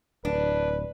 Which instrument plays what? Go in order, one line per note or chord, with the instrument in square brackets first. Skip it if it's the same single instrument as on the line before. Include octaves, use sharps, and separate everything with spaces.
[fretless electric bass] D1 [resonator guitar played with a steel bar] D4 [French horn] B4